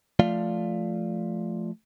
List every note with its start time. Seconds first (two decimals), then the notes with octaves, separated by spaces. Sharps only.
0.19 F3 A3 F4 D5 F5